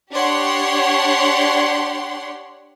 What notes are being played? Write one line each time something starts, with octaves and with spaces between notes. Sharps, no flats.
D4 G4 C#5 F#5 C6